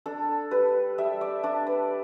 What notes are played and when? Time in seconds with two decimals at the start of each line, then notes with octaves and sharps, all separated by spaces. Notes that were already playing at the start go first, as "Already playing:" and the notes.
0.06 D4 A4
0.51 G3 B4
0.98 G3 E5
1.21 D5
1.43 D4 D5
1.67 B4